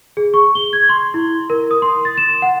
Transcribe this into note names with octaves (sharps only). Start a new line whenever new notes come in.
G#4
C#6
G7
G#6
C6
E4
A#4
D#6
C6
A6
E7
F#5